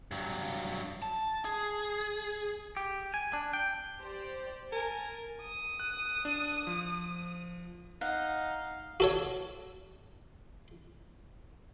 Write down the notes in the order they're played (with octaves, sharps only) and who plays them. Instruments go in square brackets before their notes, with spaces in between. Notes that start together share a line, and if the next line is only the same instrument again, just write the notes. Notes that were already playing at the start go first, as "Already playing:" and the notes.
[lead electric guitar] G2 F#3
A5
G#4
[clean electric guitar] G4
G#5
D4
G5
[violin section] G4 C5 D5
[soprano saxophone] A#4 [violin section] G#5 A5
[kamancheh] D#6
[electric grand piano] F#6
D4
F3
[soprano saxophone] D#4 [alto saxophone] F5 [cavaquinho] F#5
[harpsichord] F#4 A4 C#5